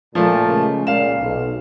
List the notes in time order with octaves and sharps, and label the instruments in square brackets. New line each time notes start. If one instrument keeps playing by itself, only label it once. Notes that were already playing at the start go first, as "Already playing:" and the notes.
[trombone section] A#2 [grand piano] F3 A3 A#3
[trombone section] C#3 G#3
[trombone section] C#2 A#2 [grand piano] F5 E7
[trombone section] B1